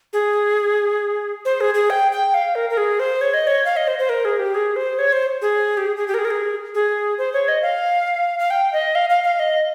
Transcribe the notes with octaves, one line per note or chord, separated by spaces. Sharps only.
G#4
C5
G#4
G#4
G5
G5
F5
A#4
A#4
G#4
C5
C#5
D#5
C#5
F5
D#5
C5
C5
A#4
G#4
G4
G#4
C5
C#5
C5
G#4
G4
G#4
G#4
G4
A#4
G#4
A#4
G#4
G#4
C5
C#5
D#5
F5
F5
G5
D#5
F5
F5
F5
D#5